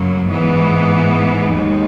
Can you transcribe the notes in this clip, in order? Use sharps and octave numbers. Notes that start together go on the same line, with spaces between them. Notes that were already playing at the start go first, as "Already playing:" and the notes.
Already playing: F#2 C#3 F#3 A#3
G#2 E3 B3
D#2 D#3 G#3 D#4